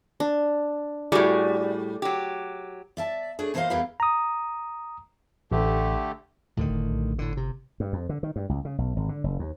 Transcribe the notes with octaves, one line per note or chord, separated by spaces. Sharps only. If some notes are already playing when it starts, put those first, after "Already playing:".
D4
A2 G3 F#4 G#4 D5
F#3 G4
D5 E5 A5
A3 D4 G#4
A#2 E3 A4 C5 D#5 F5
E2 E3 G4 A#4 B4 F5
A#5 D#6
A1 D3 A3 G4
D2 A2 D3 D#3
F#1
A#1
G1 A2 D3
C3
G2
F2
D3
D#3
G2
C#2
C#3
B1
G#1
D3
F#1
D#2